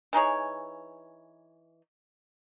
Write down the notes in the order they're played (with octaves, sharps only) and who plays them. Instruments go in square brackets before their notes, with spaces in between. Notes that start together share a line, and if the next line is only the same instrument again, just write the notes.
[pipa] E3 D#4 G#4 C#5